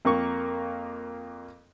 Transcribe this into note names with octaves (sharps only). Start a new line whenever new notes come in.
F2 A#3 C#6